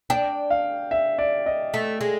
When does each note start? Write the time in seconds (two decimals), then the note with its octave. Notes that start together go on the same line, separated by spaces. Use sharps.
0.10 D4 G5
0.50 F5
0.91 E5
1.18 D5
1.46 D#5
1.74 A3
2.01 G#3